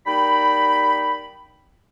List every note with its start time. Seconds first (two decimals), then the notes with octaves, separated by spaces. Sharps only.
0.07 G3 A#3 D#4 G5 B5